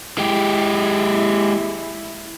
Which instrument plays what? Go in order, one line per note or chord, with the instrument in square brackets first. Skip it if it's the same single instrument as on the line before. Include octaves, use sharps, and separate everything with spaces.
[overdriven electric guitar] G#3 G4 [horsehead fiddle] E4